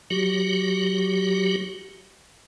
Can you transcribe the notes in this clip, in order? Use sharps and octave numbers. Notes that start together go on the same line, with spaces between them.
F#3 F#4 G4